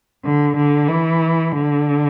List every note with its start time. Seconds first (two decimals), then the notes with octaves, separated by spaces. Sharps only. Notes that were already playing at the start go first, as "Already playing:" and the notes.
0.25 D3
0.56 D3
0.88 E3
1.51 D3